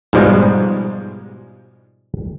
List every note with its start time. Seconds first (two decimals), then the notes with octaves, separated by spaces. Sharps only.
0.13 G#2 B2 F3 G3 G#3